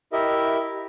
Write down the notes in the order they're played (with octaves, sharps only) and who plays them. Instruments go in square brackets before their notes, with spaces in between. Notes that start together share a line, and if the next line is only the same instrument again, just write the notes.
[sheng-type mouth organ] E4 G4 A#4 D#5 E5